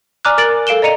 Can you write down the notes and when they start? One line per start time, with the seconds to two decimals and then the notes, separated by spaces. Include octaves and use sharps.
0.25 D5 G#5 A#5 D6 F6 F#6
0.38 A#4 D6 A6 D7 F#7
0.67 A4 F5 D7 E7 G7
0.82 D5 D#5 A#5 C#7 D#7 F7